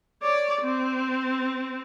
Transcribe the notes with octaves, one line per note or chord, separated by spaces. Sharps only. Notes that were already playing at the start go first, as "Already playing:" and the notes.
C#5 D5
C4